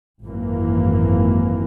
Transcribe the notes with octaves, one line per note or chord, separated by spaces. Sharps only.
G#1 F#2 E3 A#3